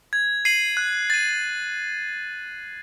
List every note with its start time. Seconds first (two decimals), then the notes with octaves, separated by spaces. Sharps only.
0.13 G#6
0.45 C7 D#7 F#7
0.77 F#6
1.10 A6 D#7